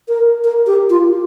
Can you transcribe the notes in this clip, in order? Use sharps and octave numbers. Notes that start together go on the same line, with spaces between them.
A#4
A#4
G4
F4